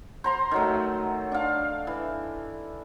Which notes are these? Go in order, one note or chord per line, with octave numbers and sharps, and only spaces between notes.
C5 A#5 C6
D#3 F#3 A3
D4 F5
E3